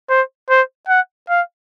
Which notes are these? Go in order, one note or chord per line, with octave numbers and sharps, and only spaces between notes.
C5
C5
F#5
F5